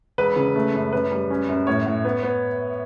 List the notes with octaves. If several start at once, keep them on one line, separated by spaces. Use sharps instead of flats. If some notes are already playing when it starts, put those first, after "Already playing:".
E1 B4
C#3
A3
F#2
F#2 B4
G3
C#4
F#2
A2 C#5
A2
B3
B3